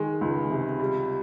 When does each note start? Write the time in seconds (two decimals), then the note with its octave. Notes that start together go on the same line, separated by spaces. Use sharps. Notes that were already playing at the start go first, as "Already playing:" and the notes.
Already playing: D#3 G#3
0.21 C#2
0.50 C3
0.80 G3